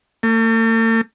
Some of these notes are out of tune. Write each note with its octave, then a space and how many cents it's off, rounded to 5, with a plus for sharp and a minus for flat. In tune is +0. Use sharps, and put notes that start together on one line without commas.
A3 +45